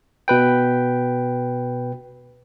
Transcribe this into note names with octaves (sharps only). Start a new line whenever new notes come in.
B2 B4 G5